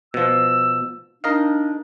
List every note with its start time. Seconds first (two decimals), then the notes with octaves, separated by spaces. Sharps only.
0.14 B2 F3 E6
1.24 D4 D#4 A#4 D#5 F5